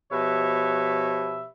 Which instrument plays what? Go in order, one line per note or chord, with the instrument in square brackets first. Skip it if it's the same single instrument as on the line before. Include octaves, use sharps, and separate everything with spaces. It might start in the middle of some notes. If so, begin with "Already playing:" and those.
[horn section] B2 F3 G4 B4 C#5 E5